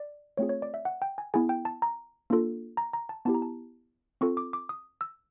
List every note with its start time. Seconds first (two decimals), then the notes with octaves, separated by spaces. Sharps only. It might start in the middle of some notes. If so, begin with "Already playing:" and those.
Already playing: D5
0.37 A3 C4 F4 G#4 C#5
0.49 C#5
0.62 D5
0.74 E5
0.85 F#5
1.02 G5
1.18 G#5
1.34 B3 E4 G#4 G#5
1.49 G5
1.65 A5
1.82 A#5
2.30 A#3 D4 F4 A4
2.77 A#5
2.93 A#5
3.09 A5
3.25 B3 E4 G4 A5
3.34 A#5
3.42 A5
4.21 C4 F4 A4 C#6
4.37 D6
4.53 D6
4.69 D#6
5.01 E6